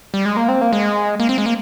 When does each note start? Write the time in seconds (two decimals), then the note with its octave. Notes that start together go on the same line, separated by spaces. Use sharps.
0.14 G3
0.25 G#3
0.37 A#3
0.48 C4
0.61 A#3
0.73 G#3
1.20 A#3
1.29 C4
1.38 G#3
1.46 A#3